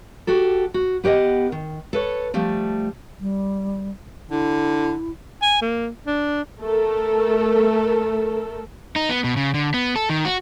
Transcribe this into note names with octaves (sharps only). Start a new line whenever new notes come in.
F#4 G4 A4
F#4
B3 G4 C#5 D#5 F#5
D#3
A4 B4 C#5
F3 G3 A3
G3
D3 E4
G#5
A#3
D4
A3 A4 A#4
D#4
B3
B2
C#3
D3
B3
A4
D#3
F#4